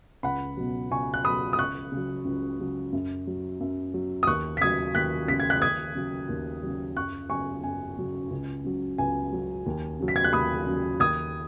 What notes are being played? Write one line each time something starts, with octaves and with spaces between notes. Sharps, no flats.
C#2 F#5 B5
B2 F#3
C#2 G#5 C#6
F#6
B2 F#3 B5 D#6
D#6
C#2 C#6 F#6
C#3
F#3
C#2
C#3 F#3
F#2
F#3
F#2
F#3
D#6
D#2 C#6 F#6
B6
C#3 F#3 D#6 G#6
D#2 F#6 B6
C#3 F#3 B6
G#6
F#6 B6
D#2 D#6 G#6
C#3 F#3
D#2
C#3 F#3
F#2 C#6 F#6
C#3 F#3 G#5 C#6
F#2 G#5
C#3 F#3
C#2
C#3 F#3
C#2 G#5
C#3 F#3
D#2
C#3 F#3
B6
G#6
F#6
D#2 B5 D#6
C#3 F#3
D#2 D#6 G#6